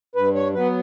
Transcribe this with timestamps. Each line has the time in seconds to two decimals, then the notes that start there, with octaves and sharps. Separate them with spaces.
0.16 G2 B4
0.35 C#5
0.53 F#3 B3 B4